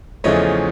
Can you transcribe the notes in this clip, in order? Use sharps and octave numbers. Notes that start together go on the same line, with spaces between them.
E2 C#3 F3 A3 C#5 D#5